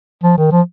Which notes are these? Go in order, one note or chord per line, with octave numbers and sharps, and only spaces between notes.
F3
D#3
F3